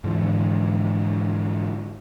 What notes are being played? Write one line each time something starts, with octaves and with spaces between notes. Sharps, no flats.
G#2 D3 E3 F3